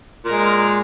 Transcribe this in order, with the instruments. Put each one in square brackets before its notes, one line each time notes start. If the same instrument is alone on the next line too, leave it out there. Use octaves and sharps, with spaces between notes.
[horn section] A#2 G#3 A#4